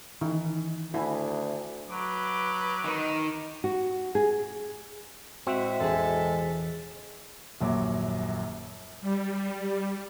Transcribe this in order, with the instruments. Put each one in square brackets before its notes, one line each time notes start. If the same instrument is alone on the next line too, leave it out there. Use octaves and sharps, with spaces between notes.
[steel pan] D#3 [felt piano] E3
[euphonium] D2 [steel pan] E4 [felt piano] F#5 G#5
[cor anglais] F#3 [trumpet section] B4 D6
[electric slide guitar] D#3 D#4
[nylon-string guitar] F#4
G#4
[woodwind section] A2 G#3 E5 [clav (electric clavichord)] C4 [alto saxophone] F#4
[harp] E1 G#4 [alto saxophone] A4
[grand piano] D#1 A#1 F#2 F#3 E5 D6
[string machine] G3